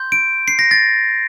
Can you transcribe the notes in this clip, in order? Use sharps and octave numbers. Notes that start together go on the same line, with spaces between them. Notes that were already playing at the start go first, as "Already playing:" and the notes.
Already playing: C6 G6
D7
C7
A#6
A6